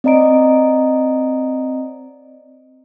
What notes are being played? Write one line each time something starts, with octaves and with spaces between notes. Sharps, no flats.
C4 D5 D#5 A#5 D7